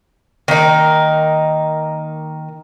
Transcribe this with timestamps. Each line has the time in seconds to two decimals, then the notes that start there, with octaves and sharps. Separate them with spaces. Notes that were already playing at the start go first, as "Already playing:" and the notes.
0.48 D#3 A#3 D#4 A#4